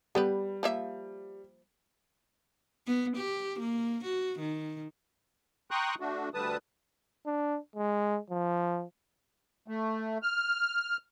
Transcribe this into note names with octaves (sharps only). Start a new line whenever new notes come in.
G3 B3 G4 B4
F3 A#3 E5
B3
G4
A#3
F#4
D#3
G5 A#5 C6 C#6 D#6 F#6
A3 D4 F#4
D2 D3 G3 B4 A5 D#6
D4
G#3
F3
A3
F6